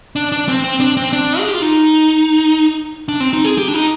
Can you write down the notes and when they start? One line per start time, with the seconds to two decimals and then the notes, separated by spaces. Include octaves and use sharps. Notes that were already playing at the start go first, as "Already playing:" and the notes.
0.16 D4
0.32 D4
0.48 C4
0.64 C4
0.80 D4
0.97 C4
1.13 D4
1.40 G#4
1.47 G4
1.54 F4
1.62 D#4
3.08 D4
3.20 C4
3.33 D#4
3.45 G#4
3.58 G4
3.68 D4
3.74 D#4